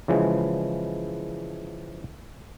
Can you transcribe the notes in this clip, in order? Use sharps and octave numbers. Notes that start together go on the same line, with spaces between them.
C#3 E3 F3 G#3